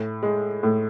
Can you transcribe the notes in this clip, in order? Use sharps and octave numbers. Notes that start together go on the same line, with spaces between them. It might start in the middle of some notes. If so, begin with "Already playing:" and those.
Already playing: A2
G#3
A2